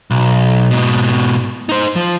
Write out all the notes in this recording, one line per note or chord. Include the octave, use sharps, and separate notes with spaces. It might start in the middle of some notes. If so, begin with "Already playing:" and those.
B1
G#2 B2
D#4 C5
F3